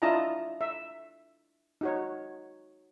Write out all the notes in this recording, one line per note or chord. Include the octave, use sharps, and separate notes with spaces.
D4 E4 F4 D#5 A5 A#5
E5
D#4 F#4 C#5